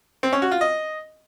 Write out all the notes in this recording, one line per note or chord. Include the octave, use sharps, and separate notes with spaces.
C4
C#4
F#4
F4
D#5